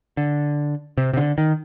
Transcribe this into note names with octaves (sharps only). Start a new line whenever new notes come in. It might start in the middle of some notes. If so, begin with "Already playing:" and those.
D3
C3
C3
D3
D#3